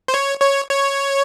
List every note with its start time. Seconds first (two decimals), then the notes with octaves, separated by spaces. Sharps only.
0.08 C5
0.14 C#5
0.42 C#5
0.70 C#5